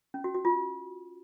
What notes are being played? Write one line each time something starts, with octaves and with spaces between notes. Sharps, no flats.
C#4
F#4
F#4
F4